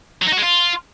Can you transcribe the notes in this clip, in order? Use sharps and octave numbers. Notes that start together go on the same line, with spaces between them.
F#3
D#4
F#4
G#3
F4